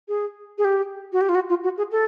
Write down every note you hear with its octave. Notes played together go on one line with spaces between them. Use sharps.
G#4
G#4
G4
F#4
G4
F4
F#4
F4
F#4
G#4
A4